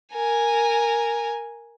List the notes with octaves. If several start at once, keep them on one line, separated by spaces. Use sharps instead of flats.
A#4 G#5